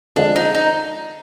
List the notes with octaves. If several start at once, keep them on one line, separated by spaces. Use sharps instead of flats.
F2 D3 F3 G#3 D4
D#4
D#4